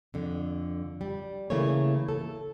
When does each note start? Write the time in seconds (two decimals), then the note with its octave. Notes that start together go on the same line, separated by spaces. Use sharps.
0.14 F2 D3
1.01 G3
1.50 C#3 E3 A3 A#3 G#4 C#5
2.09 A4